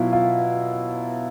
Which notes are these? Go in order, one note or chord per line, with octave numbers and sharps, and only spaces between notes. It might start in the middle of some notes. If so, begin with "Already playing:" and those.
Already playing: B2 F#3 E4 F4
F4